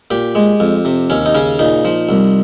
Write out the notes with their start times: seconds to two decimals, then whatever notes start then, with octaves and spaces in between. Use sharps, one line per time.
0.11 A#2 G4
0.35 G#3
0.60 F2
0.85 C3
1.10 D#2 C#4
1.26 D#4
1.35 C#3 C#4
1.59 A#2 D#4
1.85 F3
2.09 C2